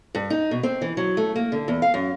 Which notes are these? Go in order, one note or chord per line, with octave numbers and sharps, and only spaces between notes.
G2
D#4
B2
C4
E3
F#3
A3
A#3
D3
E2
F5
F#2